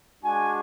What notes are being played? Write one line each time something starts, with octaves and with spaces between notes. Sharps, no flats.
G#3 D4 F#4 G#5